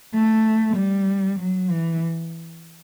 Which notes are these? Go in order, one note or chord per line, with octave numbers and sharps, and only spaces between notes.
A3
G3
F#3
E3